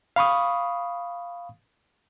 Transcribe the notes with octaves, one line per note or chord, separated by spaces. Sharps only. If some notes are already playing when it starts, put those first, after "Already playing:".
F5 B5 C#6 D#6